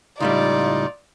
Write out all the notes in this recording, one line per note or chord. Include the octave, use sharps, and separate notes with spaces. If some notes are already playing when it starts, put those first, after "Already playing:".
C#2 A2 G3 D#4 F4 D5